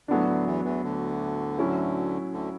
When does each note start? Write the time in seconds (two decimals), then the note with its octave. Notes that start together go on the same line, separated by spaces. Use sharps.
0.08 D2 A2 D3 F#3 B3 D4
0.28 D2 D3
0.46 E2 E3
0.65 E2 E3
0.83 D2 D3
1.58 A2 F#3 C#4 E4
2.32 D2 D3